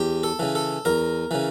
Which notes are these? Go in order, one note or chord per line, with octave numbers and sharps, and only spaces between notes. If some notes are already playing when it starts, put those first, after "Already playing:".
Already playing: E2 G4
A4
C#3 E3
A4
E2 A#4
C#3 E3